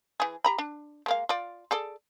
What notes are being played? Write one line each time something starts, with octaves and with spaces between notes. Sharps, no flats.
E3 G#4
G4 A#5 B5
D4
G#3 A#3 F5
F4 D5
G#4 A4 D5